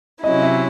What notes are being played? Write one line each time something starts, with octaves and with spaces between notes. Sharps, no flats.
C3 F#3 C#4 E4 D#5
E5